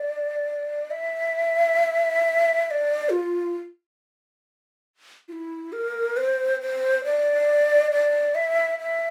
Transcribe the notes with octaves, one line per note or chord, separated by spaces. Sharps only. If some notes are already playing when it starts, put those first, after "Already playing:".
Already playing: D5
E5
E5
D5
F4
F4
E4
A#4
C5
C5
D5
D5
E5
E5